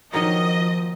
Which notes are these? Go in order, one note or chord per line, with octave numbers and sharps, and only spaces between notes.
D#3 F3 F#3 A#3 D#5